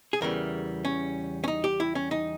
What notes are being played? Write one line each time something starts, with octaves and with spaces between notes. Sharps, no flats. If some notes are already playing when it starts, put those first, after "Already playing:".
G#4
E2 C#3 E3 G3 A#4
C#4
C#4
D#4
G4
E4
C#4
D#4